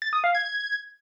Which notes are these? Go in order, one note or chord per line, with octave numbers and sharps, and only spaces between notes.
A6
D#6
F5
G#6